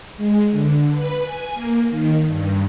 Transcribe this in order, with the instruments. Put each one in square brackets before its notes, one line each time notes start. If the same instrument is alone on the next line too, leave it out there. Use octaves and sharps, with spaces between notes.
[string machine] G#3
D3
B4
G#5
A#3
D#3
G2